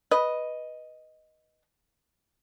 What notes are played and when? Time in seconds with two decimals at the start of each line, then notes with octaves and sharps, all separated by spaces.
0.11 B4 D#5